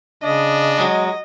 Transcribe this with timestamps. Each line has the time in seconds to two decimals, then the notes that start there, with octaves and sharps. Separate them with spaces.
0.23 C#3 D4 D#5
0.78 F#3 G#3